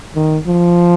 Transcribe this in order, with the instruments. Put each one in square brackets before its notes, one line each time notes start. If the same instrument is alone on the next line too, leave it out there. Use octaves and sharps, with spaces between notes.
[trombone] D#3
F3